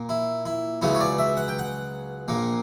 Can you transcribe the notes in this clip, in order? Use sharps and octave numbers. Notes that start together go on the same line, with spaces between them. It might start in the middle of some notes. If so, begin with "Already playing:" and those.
Already playing: A#2 A#3
E4
E4
C#2 C#3 F#3 B3 E4
C#5
D5
E5
F#5
G5
F#5
A#1 A#2 A#3